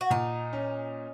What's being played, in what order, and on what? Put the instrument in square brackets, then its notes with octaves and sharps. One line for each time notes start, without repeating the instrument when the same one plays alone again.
[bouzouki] F#4
[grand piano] A#2 [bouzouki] D#4
[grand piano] C#4